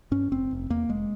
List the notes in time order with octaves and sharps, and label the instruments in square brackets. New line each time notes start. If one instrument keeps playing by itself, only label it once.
[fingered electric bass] G2 C#4
F1 C4
F1
E2 A#3
F1 G#3